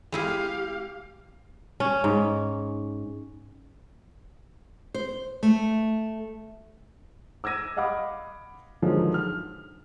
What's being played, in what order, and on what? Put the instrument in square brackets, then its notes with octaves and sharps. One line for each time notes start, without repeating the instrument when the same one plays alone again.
[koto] G#3 E4 G#4 [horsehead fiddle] G4 F5
[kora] C#4
G#2
[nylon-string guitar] C5
A3
[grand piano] D6 E6 G#6 A#6 D#7
D#5 F5 F#5 B5 D6 D#6
D3 D#3 F3 F#3 G#3
F6